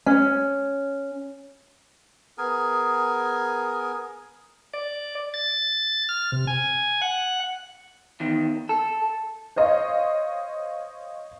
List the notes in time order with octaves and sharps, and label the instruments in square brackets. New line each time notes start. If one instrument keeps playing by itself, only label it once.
[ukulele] C#4
[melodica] B3 G#4 A#4 G#5
[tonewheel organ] D5
A6
F6
C3
G#5
F#5
[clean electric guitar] E2 D#3
A4
[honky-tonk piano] C5 C#5 D#5 F5